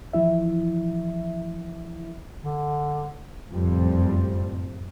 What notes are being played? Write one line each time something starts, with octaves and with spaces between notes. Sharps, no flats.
E3 F3 E4 E5
D3
F#1 F2 A2 F3 G3 C4